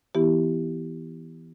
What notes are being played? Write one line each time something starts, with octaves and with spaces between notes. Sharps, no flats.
E3 B3 E4 G4